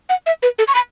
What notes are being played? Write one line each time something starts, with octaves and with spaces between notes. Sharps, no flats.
F#5
E5
B4
A4
C#6
B5